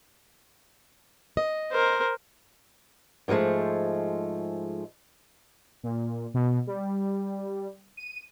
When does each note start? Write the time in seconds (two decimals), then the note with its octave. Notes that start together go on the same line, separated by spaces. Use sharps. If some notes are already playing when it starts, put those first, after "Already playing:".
1.37 D#5
1.71 A#4 C5
3.28 G#2 F3 F#3 G#3 A3
5.83 A#2
6.34 B2
6.67 G3
7.97 D#7